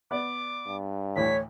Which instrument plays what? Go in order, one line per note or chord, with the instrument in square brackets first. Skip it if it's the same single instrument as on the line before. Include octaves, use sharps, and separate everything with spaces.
[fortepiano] B3 D5 [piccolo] D6
[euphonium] G2
[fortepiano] D2 A2 E3 [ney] C#5 [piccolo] B6